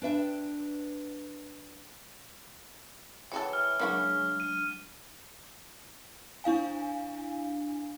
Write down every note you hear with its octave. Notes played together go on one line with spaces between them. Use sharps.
D4 B4 E5 G5
E3 G#3 F#4 A4 C#5 E5 G5
F6
C#3 F#3 G#3 A#3 D4 E4 F#4
D#7
D4 E4 F5 G#5